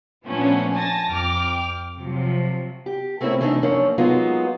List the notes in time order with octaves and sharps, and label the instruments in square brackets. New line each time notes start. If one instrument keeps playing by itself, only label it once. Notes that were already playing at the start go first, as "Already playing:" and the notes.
[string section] A#2 F3 A3 B3 C#4 D4
G#5 A5 A6 A#6
F2 G5 D6 F6
C3 F3 F#3
[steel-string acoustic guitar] G4
A3 A#3 C4 C#4 E4
E3 A3 B3 C4 D4 D#4
F#2 F3 A#3 C#4 D4
F#3 G#3 A#3 B3 D#4 F4